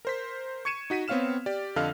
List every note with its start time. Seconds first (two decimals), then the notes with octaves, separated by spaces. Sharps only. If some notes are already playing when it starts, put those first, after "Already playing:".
0.05 A#4 C5 B6
0.65 C#6 G#6 C#7 D#7 E7
0.90 D#4 F#4 B6 D#7
1.08 B3 C4 C#5 F5 F6 E7
1.46 G4 D5
1.76 F2 D3 A4 D#5 F5 F6